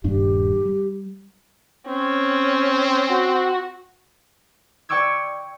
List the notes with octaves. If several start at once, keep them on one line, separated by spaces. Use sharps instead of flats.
D#1 G2 D4 G4
G3
C4 C#4
F#4
D5 G5 C#6 D6 E6 G#6